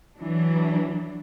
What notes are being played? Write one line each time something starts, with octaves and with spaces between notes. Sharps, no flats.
E3 F#3 D4